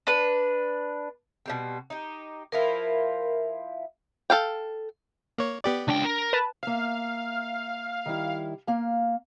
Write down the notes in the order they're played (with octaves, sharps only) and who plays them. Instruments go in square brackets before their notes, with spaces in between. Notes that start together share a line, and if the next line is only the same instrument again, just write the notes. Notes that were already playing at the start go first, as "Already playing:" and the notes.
[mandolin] D4 B4
[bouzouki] B2 G3 C4
D#4 G4
[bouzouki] F3 E4 F4 [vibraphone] A#4
[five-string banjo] A4 F5 G5
[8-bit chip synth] A#3 C#5
B3 G4 D5
[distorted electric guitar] C#2 G5 [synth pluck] D4
[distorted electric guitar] A#4
[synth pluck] B4 A5
[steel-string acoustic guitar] A#3 E5 [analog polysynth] F5
[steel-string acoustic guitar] D#3 G3 E4
A#3 F5